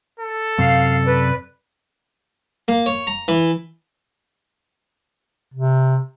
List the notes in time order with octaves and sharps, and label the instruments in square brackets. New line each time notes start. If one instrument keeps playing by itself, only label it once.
[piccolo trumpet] A4
[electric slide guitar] F#2 C3 [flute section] F5
[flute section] B4 D5
[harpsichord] A#3
C#5
A#5
E3
[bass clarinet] C3